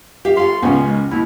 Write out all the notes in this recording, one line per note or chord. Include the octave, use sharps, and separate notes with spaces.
G4 E5 F5
F4 A4 C#5 F5 C6
C#2 A#2 C#3 B3 C#4 G5
G#3
D#2 E4 A#4